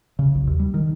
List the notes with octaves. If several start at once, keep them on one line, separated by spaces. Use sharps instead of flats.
C#3
B1
D#2
G3
D#3